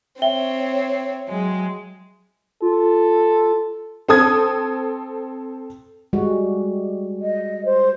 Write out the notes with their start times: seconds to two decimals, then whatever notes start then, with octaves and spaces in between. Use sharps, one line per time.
0.22 C4 C#5 E5 G5 G7
1.29 F#3 G#3
2.62 F4 A4
4.09 C4 A4 D#6 G#6
6.13 G3 G#3 F#4
7.22 D#5
7.65 C5